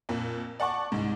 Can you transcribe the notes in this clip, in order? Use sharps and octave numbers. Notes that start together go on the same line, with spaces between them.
F2 A#2
D5 F#5 A5 C#6 D6
C2 G#2